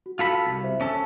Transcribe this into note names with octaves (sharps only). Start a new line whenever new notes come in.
F#4
F4 A4 B5
C2
C5 E5
C#4 A4